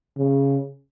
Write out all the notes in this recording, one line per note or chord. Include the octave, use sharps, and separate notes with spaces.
C#3